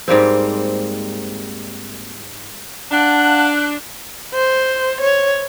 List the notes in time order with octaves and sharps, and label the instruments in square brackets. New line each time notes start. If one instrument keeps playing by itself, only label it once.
[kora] G#2 G3 A#3 C4
[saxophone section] D4 [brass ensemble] F5 F#5 A5 [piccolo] F#6
[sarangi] C5
C#5